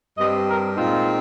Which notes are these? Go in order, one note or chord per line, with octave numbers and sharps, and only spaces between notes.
G2 G3 C4 D#5
A#4
A#2 G#3 C4 D#4 F4